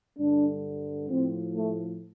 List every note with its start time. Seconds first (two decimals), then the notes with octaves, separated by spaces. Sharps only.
0.17 G2 D3 G3 D4
1.09 A2 F3 C4
1.55 A3